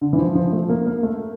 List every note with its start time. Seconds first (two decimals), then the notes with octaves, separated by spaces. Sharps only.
0.01 D3
0.13 E3
0.19 F3
0.35 F3
0.52 A3
0.69 A#3
0.86 A#3
1.03 A3